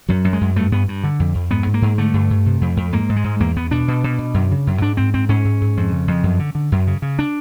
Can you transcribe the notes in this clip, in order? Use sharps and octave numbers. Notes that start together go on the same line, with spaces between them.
F#2 F#3
F#2
G#3
F#2
G2 A3
G2 B3
G2
D3
F2
F2
G#2 B3
G#2
A#3
G#2
D3 A3
G2
G2
C3
F2
F2
G#2 A#3
G#2
G#3
G#2
E2 A#3
E2 B3
B2 D4
B2
B2
B2
F#2
C#3
F#2
G#2 D4
G#2 C4
G#2 C4
G#2 C#4
G#2
G#2
F2
C#3
F2
F#2
D3
D3
F#2
C#3
C#3
D4